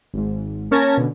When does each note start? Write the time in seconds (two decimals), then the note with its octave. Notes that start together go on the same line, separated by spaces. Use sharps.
0.14 G#1 G#2
0.71 A#3 C#4 A#4 A5 G#6 A#6
0.97 B2 D3